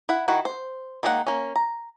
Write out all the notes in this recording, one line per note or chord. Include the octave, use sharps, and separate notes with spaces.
E4 F#5
D#3 E4 F#4 F#5
C5
D#3 G#3 A#3 F#4 F#5
A#3 C#4
A#5